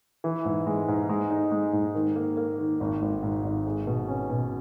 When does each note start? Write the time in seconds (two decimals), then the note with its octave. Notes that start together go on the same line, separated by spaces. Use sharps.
0.24 E3
0.45 G#2
0.67 G#3
0.88 G#2
1.09 G#3
1.30 D#4
1.52 G#3
1.73 G#2
1.95 D#3
2.16 A#3
2.37 A#3
2.59 D#3
2.80 G#1
3.02 G#1
3.23 G#2
3.44 G#1
3.66 G#4
3.87 B2
4.08 C#4
4.30 B2